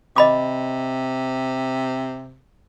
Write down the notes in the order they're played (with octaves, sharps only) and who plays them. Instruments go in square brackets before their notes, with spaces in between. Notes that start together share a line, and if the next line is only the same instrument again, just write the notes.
[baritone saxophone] C3 [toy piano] D#5 B5 D6